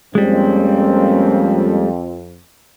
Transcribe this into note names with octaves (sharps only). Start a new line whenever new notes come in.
F2 G3 G#3 A#3 C4 C#4